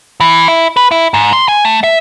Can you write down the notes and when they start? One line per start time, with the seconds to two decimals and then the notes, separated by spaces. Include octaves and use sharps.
0.20 E3
0.48 E4
0.77 B4
0.91 E4
1.14 G#2
1.33 C6
1.48 G#5
1.65 A3
1.83 E5